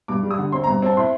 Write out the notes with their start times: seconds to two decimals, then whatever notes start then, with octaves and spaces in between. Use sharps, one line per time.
0.08 G2 D6
0.23 G3
0.31 D#6
0.38 D3
0.52 C4 C6
0.64 G2 A#5
0.82 C4 A5
0.97 A2 C6